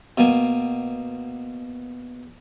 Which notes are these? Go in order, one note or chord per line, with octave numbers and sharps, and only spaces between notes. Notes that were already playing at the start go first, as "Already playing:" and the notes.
B2 A#3 G#5 A5